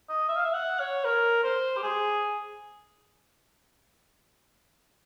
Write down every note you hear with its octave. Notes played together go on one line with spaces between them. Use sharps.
D#5
E5
F5
E5
F#5
C#5
A#4
C5
G4
G#4